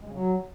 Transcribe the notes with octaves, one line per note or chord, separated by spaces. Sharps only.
G#3
C#3
F#3